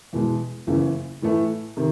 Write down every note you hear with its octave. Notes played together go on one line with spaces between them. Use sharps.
E2 B2 G#3
F#1 E2 C#3 E3
A2 E3 A3
C3 D#3